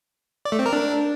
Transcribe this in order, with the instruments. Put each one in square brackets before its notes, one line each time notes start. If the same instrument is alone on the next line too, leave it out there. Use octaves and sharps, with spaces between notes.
[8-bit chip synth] D5
A3
C4
A#4
D4